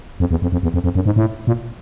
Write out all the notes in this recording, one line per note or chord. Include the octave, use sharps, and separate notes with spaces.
F2
E2
F2
F2
E2
F2
F2
F#2
G#2
A2
A#2